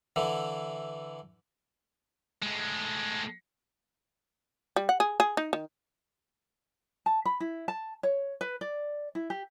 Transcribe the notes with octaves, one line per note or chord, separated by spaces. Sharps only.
D3 E3
A2 G#3
G3
F#5
G#4
G#4
D#4
D#3
A5
B5
E4
A5
C#5
B4
D5
E4
G4